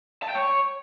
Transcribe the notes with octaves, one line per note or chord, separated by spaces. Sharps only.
A5
G5
C#5